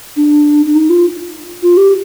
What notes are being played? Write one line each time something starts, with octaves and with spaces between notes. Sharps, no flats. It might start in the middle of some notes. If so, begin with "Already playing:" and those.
D4
D4
D#4
F4
F4
G4